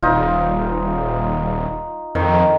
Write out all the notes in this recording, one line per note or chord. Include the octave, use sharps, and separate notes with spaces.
D#1 D#4 F4
F2 D#3